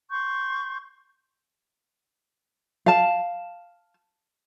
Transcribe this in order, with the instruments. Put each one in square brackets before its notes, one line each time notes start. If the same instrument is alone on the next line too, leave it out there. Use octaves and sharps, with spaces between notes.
[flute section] C6 C#6 G6
[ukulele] F5 A5